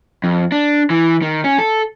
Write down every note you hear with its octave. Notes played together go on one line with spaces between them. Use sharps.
F2
D4
E3
D#3
C#4
A4